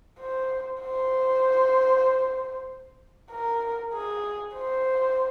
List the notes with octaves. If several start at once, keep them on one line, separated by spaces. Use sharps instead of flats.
C5
C5
A#4
G#4
C5